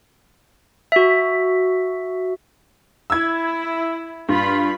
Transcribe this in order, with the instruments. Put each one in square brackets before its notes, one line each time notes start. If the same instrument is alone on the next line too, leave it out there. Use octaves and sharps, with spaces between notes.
[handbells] F#4 E5
[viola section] E4 [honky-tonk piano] E6 G#6
[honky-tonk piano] G2 [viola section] F4 B5